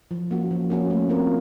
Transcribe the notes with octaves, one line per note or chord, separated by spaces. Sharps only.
F3
A#3 C#4 F#4
F3
A#3 C#4 F#4
A3
C4 F4 A#4